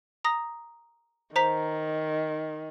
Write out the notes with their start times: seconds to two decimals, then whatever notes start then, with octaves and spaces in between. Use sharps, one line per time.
0.24 A#5 D#6 A#6
1.36 D#3 C5 A#5 B6